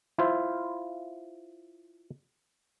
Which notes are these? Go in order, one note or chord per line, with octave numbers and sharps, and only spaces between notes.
E4 F4 C5 E5